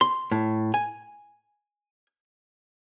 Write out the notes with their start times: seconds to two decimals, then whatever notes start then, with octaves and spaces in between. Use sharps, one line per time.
0.01 C6
0.32 A2
0.74 G#5